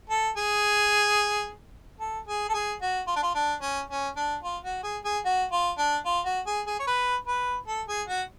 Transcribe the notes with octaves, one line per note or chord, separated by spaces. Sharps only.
A4
G#4
A4
G#4
A4
G#4
F#4
F4
D4
F4
D4
C#4
C#4
D4
F4
F#4
G#4
G#4
F#4
F4
D4
F4
F#4
G#4
G#4
C#5
B4
B4
A4
G#4
F#4